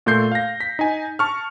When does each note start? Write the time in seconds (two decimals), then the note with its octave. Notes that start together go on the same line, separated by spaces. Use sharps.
0.06 A#2 A3 C6 G6 C7
0.32 F5 A#6
0.60 B6
0.79 D#4 G#5
1.19 A5 C#6 F6